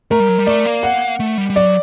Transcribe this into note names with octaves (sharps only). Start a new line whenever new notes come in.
A3 A#4
G3
F#3
G3
A3 D5
A#3
F#5
A3
G3
G3
F#3 D5